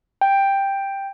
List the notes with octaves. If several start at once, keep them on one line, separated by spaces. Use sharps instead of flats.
G5